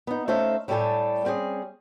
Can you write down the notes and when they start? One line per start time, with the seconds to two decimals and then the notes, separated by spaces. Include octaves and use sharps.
0.07 B3 D#4
0.28 A3 C#4 D#4 C5 E5 F5
0.68 A2 G3 A3 G4 A4 G#5
1.25 G3 C4 C#4 G#4